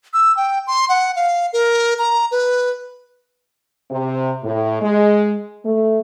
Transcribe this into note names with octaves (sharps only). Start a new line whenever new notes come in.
E6
G5
C6
F#5
F5
A#4
A#5
B4
C3
A2
G#3
A3